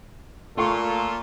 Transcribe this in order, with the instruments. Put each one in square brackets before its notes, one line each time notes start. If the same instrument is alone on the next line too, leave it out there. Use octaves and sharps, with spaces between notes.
[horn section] A#2 F4 A4 [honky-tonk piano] A3 C6 C#6